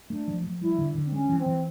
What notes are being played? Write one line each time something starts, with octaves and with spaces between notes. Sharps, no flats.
A3 D4
F3
F3
G3 E4
D3
D3
C4
G#3 C#4
E3
C4
E3